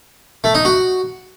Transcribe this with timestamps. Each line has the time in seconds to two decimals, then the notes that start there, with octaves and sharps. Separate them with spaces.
0.44 A3
0.55 D#4
0.65 F#4